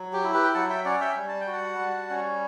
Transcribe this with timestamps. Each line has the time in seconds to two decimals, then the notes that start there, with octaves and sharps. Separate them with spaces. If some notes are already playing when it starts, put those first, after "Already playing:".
Already playing: F#3
0.13 G4
0.24 E4
0.34 G4 B4
0.44 G5
0.55 F#3 F#5 A5
0.70 E5 G5
0.85 C#4 D5 F#5
1.01 E5 G5
1.16 G3
1.28 A5
1.41 G5
1.47 F#4
1.53 F#5 A5
1.79 G3
2.10 C#4